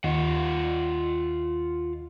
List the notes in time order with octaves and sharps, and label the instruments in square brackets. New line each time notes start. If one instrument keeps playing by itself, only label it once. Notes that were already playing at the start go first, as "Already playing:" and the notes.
[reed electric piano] D#2 [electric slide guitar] F4 D#5 F#5